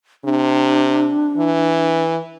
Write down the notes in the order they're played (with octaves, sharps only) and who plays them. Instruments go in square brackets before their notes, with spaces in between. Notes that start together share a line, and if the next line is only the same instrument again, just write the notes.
[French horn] C3 [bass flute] D4
[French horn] E3